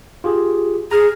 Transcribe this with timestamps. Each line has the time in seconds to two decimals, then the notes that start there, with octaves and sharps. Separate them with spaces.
0.24 F4 G4 G#4
0.91 G#4 A#5 F6